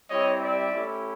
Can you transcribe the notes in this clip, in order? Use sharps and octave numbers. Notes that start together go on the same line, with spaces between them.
G3 C4 E4 G4 C#5 D#5
D5 E5
A3 C#4 E4 G4